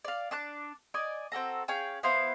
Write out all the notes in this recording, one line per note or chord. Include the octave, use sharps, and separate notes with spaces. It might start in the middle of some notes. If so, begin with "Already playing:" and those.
D5 F5
D4 A5 D6 F#6
D5 D#5 G#5 D6
C4 F#4 A4 A#5
C#4 G#4 F5 G5
B3 E4 C5 F5